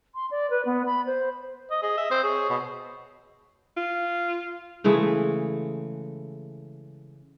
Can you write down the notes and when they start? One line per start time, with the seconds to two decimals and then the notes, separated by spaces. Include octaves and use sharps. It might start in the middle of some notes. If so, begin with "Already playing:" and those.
0.15 C6
0.31 D5
0.50 B4
0.65 B3
0.86 B5
1.06 C5
1.71 D#5
1.83 G#4 D#5
1.97 E5
2.11 C4 C5
2.23 G#4 C#5
2.49 B2
3.77 F4
4.84 C#3 E3 G#3 A3